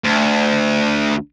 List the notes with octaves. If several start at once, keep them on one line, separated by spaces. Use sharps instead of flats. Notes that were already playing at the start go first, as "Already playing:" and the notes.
D2